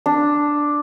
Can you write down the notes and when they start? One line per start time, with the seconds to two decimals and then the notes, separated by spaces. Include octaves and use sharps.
0.06 D4